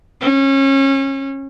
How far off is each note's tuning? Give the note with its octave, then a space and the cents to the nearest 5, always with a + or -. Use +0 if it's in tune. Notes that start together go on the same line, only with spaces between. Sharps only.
C#4 -30